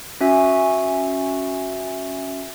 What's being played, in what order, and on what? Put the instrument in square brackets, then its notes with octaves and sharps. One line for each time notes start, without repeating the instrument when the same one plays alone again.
[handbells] C#4 F#4 E5 G#5